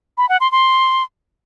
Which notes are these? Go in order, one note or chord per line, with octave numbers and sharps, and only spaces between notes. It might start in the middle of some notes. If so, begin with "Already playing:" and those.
B5
F#5
C6
C6